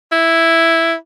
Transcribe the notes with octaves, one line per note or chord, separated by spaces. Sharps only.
E4